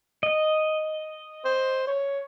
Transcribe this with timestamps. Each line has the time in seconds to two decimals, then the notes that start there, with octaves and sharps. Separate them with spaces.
0.23 D#5
1.45 C5
1.87 C#5